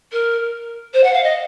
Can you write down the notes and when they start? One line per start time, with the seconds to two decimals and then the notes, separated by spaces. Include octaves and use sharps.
0.12 A#4
0.93 C5
1.03 F#5
1.13 F5
1.23 D#5